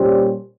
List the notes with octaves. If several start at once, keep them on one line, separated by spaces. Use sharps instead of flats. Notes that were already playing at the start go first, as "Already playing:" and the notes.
Already playing: A#2 G3 C#4 G4 C5